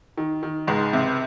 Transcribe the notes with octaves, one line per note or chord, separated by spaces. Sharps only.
D#3
D#3
C#2 G#2 G#3
C3